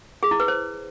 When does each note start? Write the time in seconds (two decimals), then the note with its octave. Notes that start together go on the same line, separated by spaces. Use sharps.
0.23 G#4
0.31 E4
0.40 B4
0.48 C5